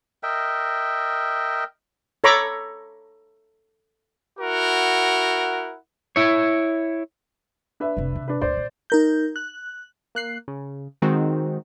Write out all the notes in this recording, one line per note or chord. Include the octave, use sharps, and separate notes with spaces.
A#4 D#5 E5 G5
A4 C#5 A#5 B5 C#6 D6
E4 F#4 A#4 F#5
E4 C#5
D4 B4 E5
F1 C2
C3
D4 B4
D2 A2 C5 D5
A#2
D#4 A#4 G6
F#6
A#3 F#6 C7
C#3
D#3 G#3 C4 D#4 F#4